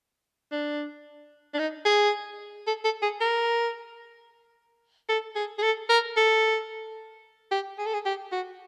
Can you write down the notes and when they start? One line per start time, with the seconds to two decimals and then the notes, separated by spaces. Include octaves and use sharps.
0.52 D4
1.54 D4
1.59 D#4
1.85 G#4
2.67 A4
2.84 A4
3.03 G#4
3.21 A#4
5.09 A4
5.36 G#4
5.59 G#4
5.63 A4
5.90 A#4
6.17 A4
7.52 G4
7.78 G#4
7.86 A4
7.94 G#4
8.06 G4
8.32 F#4